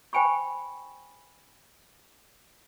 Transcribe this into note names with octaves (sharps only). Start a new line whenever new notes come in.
C5 G5 G#5 B5 C#6